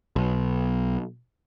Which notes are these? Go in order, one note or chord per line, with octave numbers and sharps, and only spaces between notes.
B1